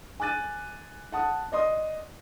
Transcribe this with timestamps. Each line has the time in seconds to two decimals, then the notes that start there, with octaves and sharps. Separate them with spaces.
0.20 G#5 D6 F#6 A6 D#7
1.12 F#5 A5 D#6
1.52 D5 D#5 C6 D#6